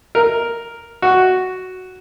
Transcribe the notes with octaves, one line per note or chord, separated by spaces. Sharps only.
A#4
F#4